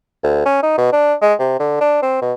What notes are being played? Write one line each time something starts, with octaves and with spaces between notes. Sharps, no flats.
D2
C#4
D#4
B2
D4
G#3
C3
D3
D4
C4
B2